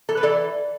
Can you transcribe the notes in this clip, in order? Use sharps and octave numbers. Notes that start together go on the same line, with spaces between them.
E3 A4
B4
E3 A4 D5